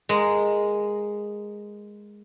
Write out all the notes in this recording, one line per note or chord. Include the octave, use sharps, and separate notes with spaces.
G#3 A#3